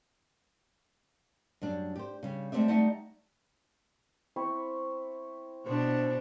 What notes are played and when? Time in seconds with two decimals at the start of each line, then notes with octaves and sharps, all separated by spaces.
1.62 F#2 G3 D4
1.96 G4 C5
2.23 C#3 G3
2.52 G#3 A3 C4 G4 D5 E5
2.68 G3 A3 D#4 F#5 A5
4.36 C4 E4 C#6
5.66 B2 D4 C5